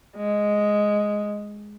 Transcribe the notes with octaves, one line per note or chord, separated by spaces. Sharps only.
G#3